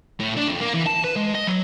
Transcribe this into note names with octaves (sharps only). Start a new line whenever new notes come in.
A2
D4
F2
A#3
E3
A5
B4
G#3
D#5
F#3